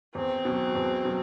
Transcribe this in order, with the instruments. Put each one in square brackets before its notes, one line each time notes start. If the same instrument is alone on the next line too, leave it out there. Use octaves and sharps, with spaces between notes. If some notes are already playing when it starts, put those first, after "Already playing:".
[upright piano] E2 [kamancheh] C4
[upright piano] B2 F#3
E2
B2 F#3